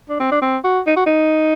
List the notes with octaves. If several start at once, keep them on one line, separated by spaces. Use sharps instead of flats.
D4
C4
D4
C4
F#4
D#4
F#4
D#4